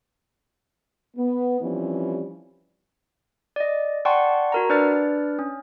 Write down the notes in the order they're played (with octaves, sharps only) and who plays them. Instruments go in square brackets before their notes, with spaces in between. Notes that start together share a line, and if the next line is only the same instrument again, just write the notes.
[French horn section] B3
E3 F3 G3 C4 C#4
[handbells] D5 D#5
D5 F#5 G5 A5 C6 C#6
F#4 A#4 A#5
D4 B4 D5 F6 A6
C#4